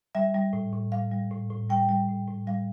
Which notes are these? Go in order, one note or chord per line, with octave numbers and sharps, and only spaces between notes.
G3 E5
G3
A2
A2
G3 F5
G3
A2
A2
G3 G5
G3
A2
A2
G3 F5